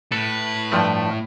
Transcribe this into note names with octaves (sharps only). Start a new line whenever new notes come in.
A2 A4 B4
G2 F3 A3